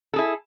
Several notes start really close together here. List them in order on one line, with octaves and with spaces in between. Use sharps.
A4 G#4 E4